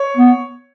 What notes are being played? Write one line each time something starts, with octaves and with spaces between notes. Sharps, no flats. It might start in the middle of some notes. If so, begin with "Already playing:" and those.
Already playing: C#5
B3